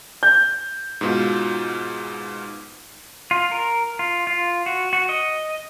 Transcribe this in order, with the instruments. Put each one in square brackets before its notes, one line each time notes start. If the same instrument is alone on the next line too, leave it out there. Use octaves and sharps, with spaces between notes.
[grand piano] G6
[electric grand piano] G#2 B2 F4
[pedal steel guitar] F4
A#4
F4
F4
F#4
F#4
D#5